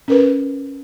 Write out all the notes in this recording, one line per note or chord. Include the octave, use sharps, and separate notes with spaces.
C#4 A#4 B4